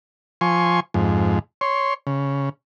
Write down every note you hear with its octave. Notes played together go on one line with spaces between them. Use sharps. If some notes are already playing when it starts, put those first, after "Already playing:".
F3 G#5 C6 C#6
F2 G#2
C#5 C6
C#3